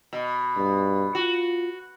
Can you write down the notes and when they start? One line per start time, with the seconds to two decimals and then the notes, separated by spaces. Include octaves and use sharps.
0.13 B2
0.57 G2
1.15 F4 F#4